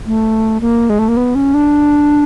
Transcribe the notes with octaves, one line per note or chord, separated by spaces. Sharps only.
A3
A#3
G#3
A3
A#3
B3
C#4
D4